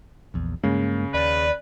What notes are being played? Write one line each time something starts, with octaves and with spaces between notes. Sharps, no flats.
A#1 E2
G2 C#3 G#3 A#3
D#2 B4 D5